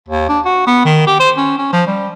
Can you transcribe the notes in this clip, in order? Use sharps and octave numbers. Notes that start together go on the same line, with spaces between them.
D#2
D4
F#4
B3
D#3
G4
C5
C#4
C#4
F3
G3